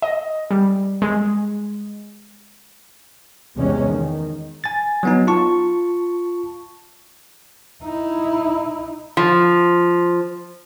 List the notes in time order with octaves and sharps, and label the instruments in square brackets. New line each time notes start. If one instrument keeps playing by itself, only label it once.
[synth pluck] D#5
G3
G#3
[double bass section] E2 C3 G#3 C#4
D#3
[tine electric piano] G#5 A6
F#3 B3 D#4
F4 A5 C#6
[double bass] D#4 E4
[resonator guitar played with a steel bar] F3